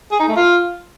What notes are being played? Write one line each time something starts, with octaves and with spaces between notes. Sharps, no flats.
G#4
D#4
A3
F4